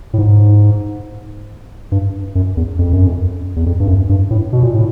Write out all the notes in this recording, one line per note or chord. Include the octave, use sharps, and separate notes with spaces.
A2
G#2
G2
F#2
E2
F2
F#2
F2
E2
F2
G2
F#2
G2
A2
B2
A#2
A2